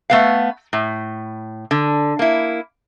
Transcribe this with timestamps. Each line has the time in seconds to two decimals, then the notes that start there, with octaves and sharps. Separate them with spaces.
0.10 A3 B3 F5
0.73 A2
1.71 D3
2.19 A#3 E4